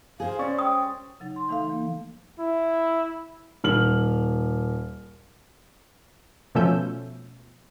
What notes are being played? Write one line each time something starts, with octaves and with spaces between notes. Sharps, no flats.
G#4 C5 F5
C#4 D5 C#6 A6
G5 D#6
C#3 F#3 D#4
C6
E3 A3 D#4 A4 F5
E3 A#3
E4
D#1 F6 F#7
B2 F3 A3 C#4 E6 G6